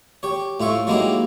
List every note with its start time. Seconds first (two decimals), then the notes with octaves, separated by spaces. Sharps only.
0.23 G4 C#5
0.60 A2 F4 E5 C#6
0.87 F#3 G#3 A#3 D#4 E4 G4